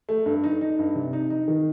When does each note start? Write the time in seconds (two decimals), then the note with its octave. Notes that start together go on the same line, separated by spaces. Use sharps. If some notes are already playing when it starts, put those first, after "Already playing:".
0.09 A3
0.26 G2
0.44 D#4
0.61 D#4
0.79 G2
0.95 C3
1.13 D#4
1.30 D#4
1.48 D#3